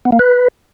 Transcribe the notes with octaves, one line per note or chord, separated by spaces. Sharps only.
B3
A#3
B4